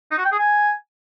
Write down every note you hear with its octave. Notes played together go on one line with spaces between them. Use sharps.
D#4
F#4
G5
G#4
G#5